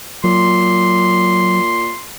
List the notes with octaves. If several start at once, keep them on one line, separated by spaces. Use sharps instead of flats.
A#2 F#3 C6